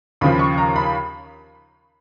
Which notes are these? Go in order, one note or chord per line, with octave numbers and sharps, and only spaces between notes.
D#2 C#3 F3 B5
C#6
A#5
B5